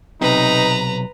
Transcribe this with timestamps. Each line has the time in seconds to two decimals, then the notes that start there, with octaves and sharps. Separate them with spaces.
0.21 B1 C3 D#4 B4 A#5